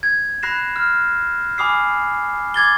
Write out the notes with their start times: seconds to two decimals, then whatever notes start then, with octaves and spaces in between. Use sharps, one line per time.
0.03 G#6
0.43 B5 F#6 A#6 C7 E7
0.76 F6
1.58 G#5 B5 D6 D#6 F6 C7
2.54 D6 G#6 A6 G7